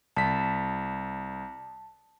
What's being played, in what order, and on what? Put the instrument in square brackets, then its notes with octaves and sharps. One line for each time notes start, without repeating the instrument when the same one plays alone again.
[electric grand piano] C2 B6 [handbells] A5